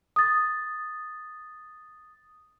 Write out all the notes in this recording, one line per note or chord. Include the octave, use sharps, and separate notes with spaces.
D#6 A6